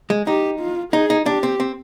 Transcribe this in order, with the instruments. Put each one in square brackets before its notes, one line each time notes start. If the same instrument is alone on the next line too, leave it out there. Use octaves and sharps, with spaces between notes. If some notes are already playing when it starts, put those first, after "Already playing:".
[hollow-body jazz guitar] G#3
[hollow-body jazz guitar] D#4 [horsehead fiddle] G4
[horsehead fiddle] F4
[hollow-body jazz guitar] D#4 [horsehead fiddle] G#4
[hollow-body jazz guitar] D#4
[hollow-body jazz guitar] D4 [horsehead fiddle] G4
[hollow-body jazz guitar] C4
C4